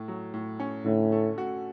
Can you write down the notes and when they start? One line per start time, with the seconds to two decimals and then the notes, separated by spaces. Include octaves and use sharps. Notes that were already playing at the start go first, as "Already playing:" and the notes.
Already playing: A2
0.08 F#3
0.34 A2
0.60 C#4
0.86 A2 D3
1.12 A3
1.38 F#4